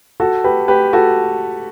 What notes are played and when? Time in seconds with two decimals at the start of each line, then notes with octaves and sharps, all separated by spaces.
0.20 F#4 A4
0.44 G4 B4
0.68 G4 B4
0.93 F#4 A4